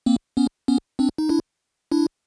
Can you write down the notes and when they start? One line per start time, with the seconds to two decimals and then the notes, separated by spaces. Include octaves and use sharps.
0.06 A#3 C4
0.37 B3 C#4
0.68 B3 C#4
0.99 C4 D4
1.18 D#4
1.29 D4 E4
1.92 D4 E4